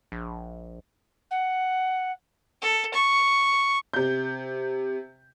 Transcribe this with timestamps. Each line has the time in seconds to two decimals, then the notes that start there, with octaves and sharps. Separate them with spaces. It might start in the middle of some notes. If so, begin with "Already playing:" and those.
0.12 A#1
1.31 F#5
2.62 A4
2.94 C#6
3.94 C3 G6